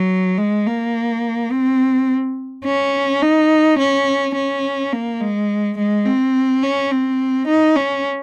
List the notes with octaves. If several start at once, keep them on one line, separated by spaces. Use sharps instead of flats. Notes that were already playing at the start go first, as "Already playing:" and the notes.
Already playing: F#3
G#3
A#3
C4
C#4
D#4
C#4
C#4
A#3
G#3
G#3
C4
C#4
C4
D#4
C#4